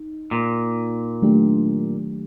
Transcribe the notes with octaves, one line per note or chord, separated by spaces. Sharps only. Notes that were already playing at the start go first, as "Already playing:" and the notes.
Already playing: D#4
A#2
D#3 F#3 A3 D4 G4